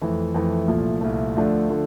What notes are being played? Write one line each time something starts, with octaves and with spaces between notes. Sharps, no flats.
F2 E3 A3
F2 E3 A3
C2 A#2 F3 A3
C2 A#2 F3 A3
D2 D3 F3 A3 D4
D3 F3 A3